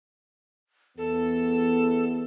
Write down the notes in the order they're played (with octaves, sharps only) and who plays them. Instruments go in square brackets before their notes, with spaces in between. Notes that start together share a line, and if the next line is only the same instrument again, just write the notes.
[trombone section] E2 B3 [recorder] A4